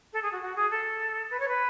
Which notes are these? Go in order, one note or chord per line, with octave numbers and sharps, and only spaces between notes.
A4
G#4
F#4
F#4
G#4
A4
B4
C#5
B4